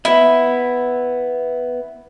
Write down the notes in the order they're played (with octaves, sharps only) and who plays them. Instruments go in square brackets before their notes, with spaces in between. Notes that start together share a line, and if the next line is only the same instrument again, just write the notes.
[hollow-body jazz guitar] B3 D#5 [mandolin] E4